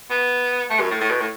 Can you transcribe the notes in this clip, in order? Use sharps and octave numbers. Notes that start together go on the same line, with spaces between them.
B3
A3
F#2
A2
A2
B2
A2